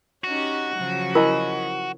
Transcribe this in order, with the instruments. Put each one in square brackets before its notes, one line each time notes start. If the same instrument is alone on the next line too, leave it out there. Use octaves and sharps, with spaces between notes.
[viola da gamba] C#4 D#4 G4 [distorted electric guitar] F#4
[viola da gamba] C#3 F3 F#3
[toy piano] E4 A#4 [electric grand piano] D#5 G#5 B5